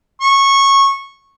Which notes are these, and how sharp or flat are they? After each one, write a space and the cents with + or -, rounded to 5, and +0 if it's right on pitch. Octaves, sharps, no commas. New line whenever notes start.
C#6 -15